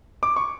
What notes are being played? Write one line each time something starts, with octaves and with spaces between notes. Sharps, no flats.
D6
C#6